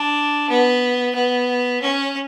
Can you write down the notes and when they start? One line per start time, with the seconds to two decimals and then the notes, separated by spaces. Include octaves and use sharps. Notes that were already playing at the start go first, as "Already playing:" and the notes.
Already playing: D4
0.50 B3
1.15 B3
1.82 C#4